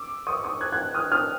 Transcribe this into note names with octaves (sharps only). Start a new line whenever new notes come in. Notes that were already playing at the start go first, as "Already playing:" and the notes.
Already playing: D6 E6
C#6 D#6
C#6 D#6
F#6 G#6
F#6 G#6
D#6 F6
D#6 F6